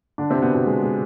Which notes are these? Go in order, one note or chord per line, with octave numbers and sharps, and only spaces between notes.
D3 D4
C3 C4
B2 B3
B2 B3
G#3
G#3